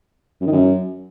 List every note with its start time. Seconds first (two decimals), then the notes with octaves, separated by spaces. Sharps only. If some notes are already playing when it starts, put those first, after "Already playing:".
0.41 F#2
0.46 D#3
0.52 F#2